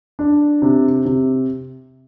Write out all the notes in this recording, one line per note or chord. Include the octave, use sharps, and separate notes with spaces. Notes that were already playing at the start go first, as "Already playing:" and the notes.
D4
C3
C3